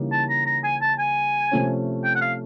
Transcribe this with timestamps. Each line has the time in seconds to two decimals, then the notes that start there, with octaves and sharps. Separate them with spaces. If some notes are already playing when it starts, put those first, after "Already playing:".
Already playing: C#3 E3 G3 A#3 D#4
0.12 A5
0.29 A#5
0.46 A#5
0.64 G#5
0.81 A5
0.99 G#5
1.51 C3 F3 A3 C#4
2.04 G5
2.15 F#5
2.21 F5